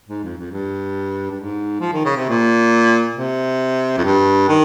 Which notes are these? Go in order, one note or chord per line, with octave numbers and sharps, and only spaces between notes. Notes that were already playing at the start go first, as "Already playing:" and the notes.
G#2
F2
F2
G2
G2
G#2
F3
D#3
C#3
C3
A#2
C3
F2
G2
D#3